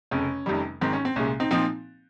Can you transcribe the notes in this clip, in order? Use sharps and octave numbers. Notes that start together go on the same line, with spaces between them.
F1 F2 C#3 C#4
F1 F2 C3 D#3 G3
G#1 G#2 D#3 C4
C#4
C4
C2 A#2 G#3 C#4
C4 D#4
A#2 F3 C4 D#4